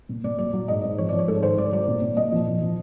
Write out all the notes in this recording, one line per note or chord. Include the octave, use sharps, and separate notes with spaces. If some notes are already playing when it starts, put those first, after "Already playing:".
A#2
A#2 D5
F#3 D5
F#3
G#2 D#5
G#2
F3 C#5
F3 D5
C#5
G#2 A4
D#3 C5
G#2 D5
F#3 D5
A#2
A#2
A#2 D#5
F3
F3
F3